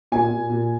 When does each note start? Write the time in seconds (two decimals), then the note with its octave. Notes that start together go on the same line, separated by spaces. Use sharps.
0.12 A#2 G#5
0.30 A#2
0.49 A#2